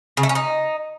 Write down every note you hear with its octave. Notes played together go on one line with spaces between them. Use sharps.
C#3
A3
C#4
D#4